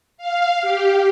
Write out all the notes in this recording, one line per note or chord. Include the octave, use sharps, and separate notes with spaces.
F5
G4